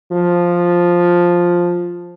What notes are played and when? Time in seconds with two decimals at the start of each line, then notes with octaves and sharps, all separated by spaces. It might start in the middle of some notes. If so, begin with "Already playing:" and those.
0.12 F3